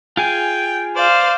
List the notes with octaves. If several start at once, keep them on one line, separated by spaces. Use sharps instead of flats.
F4 G#4 G5 G#5
C5 D5 F5